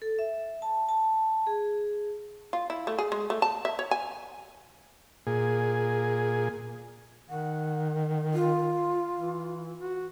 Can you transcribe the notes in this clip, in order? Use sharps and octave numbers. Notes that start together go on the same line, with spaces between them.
A4
E5
A5
A5
G#4
F4
E4
A3
G#4
G#3
A3
A5
E5
C#5
G#5
A#2 G#4
D#3 F#5
F4
E3
F#4